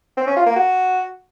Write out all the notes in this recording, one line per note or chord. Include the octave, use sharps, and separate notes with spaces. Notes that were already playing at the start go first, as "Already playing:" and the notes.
C4
C#4
F4
A#3
F#4